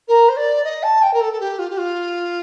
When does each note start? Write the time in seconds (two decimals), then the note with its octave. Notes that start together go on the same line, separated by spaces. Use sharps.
0.08 A#4
0.29 C5
0.37 D5
0.64 D#5
0.83 A5
1.02 G5
1.14 A#4
1.21 A4
1.33 A4
1.40 G4
1.59 F4
1.70 G4
1.78 F4